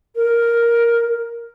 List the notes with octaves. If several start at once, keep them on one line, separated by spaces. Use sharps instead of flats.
A#4